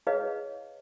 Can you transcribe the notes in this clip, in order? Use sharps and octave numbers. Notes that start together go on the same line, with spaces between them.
E4 G#4 B4 C#5 D#5 F5